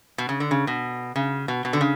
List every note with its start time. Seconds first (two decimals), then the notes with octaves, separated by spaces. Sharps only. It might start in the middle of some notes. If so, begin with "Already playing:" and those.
0.18 B2
0.29 C#3
0.40 D3
0.51 C#3
0.67 B2
1.16 C#3
1.48 B2
1.65 B2
1.73 D3
1.81 C#3